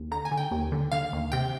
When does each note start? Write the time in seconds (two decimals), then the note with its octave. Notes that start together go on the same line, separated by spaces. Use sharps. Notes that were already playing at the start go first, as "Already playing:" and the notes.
Already playing: D#2
0.11 D3 A#5
0.25 G#5
0.31 D3
0.37 G5
0.51 D#2
0.72 D3
0.92 D3 F5
1.13 D#2
1.32 C3 G5